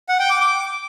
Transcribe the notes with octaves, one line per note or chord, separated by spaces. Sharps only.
F#5
G5
D6
D6